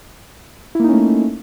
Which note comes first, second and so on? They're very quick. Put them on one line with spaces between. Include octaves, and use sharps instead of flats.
E4 A#3 D#4 C#4 A3